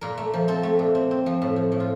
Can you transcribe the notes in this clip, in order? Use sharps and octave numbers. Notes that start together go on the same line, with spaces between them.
A#2 A#4
A3
F3
C4 A4
A3
A#2
C4
C4
F3
A2
F3
A2
F4